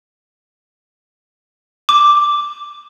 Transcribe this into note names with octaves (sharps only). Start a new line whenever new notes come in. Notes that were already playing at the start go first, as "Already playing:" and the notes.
D6